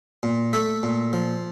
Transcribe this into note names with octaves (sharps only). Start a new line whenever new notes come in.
A#2
A3 E5
A#2
F3